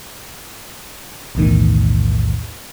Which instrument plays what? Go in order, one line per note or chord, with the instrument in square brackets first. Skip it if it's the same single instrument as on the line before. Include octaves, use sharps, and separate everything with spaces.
[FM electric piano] B1 E2 A2 D#3